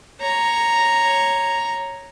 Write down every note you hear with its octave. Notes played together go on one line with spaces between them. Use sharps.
C#5 A#5